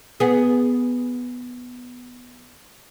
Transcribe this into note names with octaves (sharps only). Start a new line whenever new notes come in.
B3 G#4